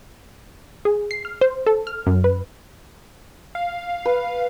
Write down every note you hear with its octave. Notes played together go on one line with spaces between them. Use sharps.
G#4
C7
F6
C5
A4
F6
F#2
B4
F5
B4